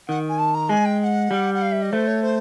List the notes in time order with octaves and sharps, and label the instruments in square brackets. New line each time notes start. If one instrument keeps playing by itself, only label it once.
[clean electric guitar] D#3 [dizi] F#5
[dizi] G#5
A5
A#5
[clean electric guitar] G#3 [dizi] G#5
[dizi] G5
G5
F#5
[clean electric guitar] G3
[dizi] F#5
F5
E5
D#5
[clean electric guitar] A3 [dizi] C5
[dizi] C#5
C5